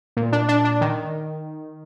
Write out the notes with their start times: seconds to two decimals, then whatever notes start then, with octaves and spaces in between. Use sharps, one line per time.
0.17 A#2
0.32 D4
0.49 D4
0.65 D4
0.81 D#3